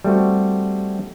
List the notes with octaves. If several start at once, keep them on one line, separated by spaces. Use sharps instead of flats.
G3 A3 C4 F#4